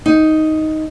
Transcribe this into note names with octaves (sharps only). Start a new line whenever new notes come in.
D#4